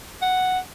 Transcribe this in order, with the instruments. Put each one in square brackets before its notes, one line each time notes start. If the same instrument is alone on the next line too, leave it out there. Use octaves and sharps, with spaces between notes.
[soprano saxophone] F#5